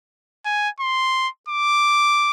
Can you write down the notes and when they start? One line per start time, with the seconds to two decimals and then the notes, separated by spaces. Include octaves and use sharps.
0.45 G#5
0.80 C6
1.49 D6